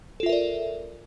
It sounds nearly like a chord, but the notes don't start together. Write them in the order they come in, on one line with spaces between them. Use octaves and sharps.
A4 F4 E5 A#4 D5